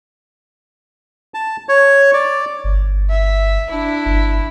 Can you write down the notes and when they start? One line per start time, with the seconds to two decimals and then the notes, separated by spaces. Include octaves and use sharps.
1.34 A5
1.69 C#5
2.14 D5
2.64 G1
3.10 E5
3.70 D4 E4
4.06 G1